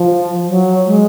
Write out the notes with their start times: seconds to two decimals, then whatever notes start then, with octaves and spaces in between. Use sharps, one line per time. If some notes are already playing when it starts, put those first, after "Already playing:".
Already playing: F3
0.48 F#3
0.86 G#3